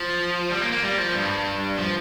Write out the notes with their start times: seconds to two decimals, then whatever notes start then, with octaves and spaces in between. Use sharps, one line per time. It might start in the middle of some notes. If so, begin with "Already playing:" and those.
Already playing: F3
0.51 G3
0.61 A#3
0.72 A#3
0.83 G3
0.98 F3
1.14 G2
1.77 F3